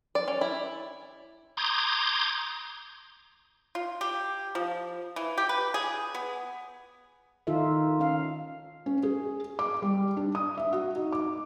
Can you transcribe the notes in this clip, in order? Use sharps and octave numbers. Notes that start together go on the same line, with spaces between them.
D5
C#4
E4
A#5 C6 D6 D#6 G6 G#6
F4
G4
F3
E3
G4
B4
G#4
B3
D#3 D#4 F4 A4 E5
C#4 F5
C#4
G#4
D6
G3
D4
D#6
E5
F#4
D#4
D6